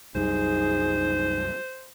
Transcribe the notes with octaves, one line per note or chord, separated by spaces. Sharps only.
C2 F#2 G3 D#4 G#4 C5